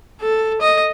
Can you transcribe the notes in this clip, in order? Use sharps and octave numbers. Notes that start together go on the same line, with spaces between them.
A4
D#5